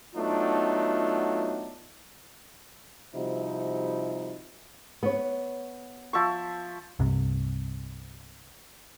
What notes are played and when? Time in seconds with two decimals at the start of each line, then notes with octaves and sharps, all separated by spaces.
0.15 F#3 A3 B3 D4 D#4 F4
3.15 C3 F3 G3 D#4 E4 F#4
5.03 B3 C#5
6.13 F3 E5 C#6
6.99 C2 G2 C3